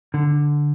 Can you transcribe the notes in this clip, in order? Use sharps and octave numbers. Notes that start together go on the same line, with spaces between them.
D3